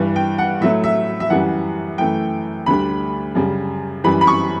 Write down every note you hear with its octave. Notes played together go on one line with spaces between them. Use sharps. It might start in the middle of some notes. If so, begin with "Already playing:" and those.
Already playing: G2 E3 G3
G5
F#5
A2 F#3 A3 E5
E5
E5
F#2 E3 G3 F#5
F#2 E3 A3 G5
D2 D3 G3 B5
F#2 C#3 G3
F#2 E3 G3 B5
B5
C#6